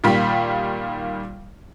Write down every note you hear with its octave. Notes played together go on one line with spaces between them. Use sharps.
A#2 D#3 G3 F4 B6